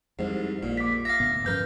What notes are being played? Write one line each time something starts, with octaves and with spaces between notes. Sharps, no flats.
C2 F2 G#2
A#1 A#2
D6 B6
E5 F5 A#6
D2 A2 B3
G2 F3 C#4 A#4 B4 G6